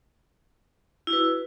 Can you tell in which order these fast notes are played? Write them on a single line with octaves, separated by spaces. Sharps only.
E4 F#4 B4